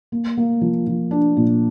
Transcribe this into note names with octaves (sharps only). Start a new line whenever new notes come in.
A#3
A#3
F3
F3
D4
A#2